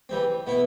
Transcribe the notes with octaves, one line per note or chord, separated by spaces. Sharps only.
E3 G3 C4
B2 B3 E4